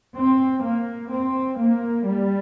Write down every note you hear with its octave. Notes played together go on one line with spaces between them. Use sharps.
C4
A#3
C4
A#3
G3